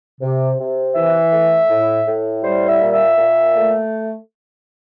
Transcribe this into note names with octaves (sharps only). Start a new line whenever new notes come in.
C3
C3
E3 E5
A3
A2
A2
G3 C5
E5
A#2
E5
A#2
A3